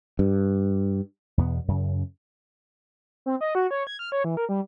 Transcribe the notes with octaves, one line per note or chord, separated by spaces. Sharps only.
G2
E2 B2 B3
F#2 C#3
C4
D#5
F#4
C#5
G#6
F6
C#5
E3
A#4
G3